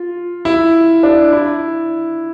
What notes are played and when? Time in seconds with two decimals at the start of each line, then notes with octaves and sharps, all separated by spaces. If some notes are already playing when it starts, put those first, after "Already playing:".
Already playing: F4
0.45 E4
1.03 D4
1.33 E4